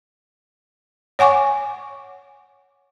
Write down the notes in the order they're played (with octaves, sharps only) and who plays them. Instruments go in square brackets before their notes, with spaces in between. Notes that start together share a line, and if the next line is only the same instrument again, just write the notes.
[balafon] C#5 F#5 G#5 C#6 D6